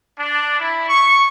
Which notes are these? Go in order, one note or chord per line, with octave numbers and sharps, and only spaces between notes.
D4
E4
C#6